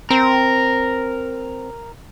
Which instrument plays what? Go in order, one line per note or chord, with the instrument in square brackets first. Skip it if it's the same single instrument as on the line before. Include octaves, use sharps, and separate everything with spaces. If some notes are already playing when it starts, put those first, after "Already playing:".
[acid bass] C4 [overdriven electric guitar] A#4